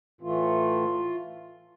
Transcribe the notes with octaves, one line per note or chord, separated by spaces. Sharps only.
A2 E3 A3 F4